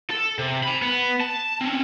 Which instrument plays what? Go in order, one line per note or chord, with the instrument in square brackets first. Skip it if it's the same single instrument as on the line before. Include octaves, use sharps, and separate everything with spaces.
[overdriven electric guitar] A4
C3
G#5 B5
B3
A5
C4 C#4